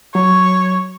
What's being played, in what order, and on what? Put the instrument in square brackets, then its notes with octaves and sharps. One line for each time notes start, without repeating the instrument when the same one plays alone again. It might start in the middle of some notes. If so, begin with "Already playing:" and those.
[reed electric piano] F#3 [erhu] C#5